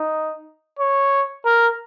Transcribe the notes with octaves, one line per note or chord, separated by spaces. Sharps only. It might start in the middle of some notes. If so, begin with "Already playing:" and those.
Already playing: D#4
C#5
A#4